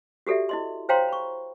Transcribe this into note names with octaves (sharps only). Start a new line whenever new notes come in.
F#4 G4 A4 D5 E5
E4 D#5 C6
C5 C#5 F5 G5 A#5 C6
B5 C#6